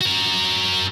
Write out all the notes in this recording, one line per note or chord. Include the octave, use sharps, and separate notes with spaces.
F#4 A#4